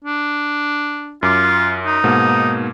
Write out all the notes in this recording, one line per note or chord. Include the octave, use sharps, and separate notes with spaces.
D4
F#2 F4 D6
D#4
G#2 B2 A#3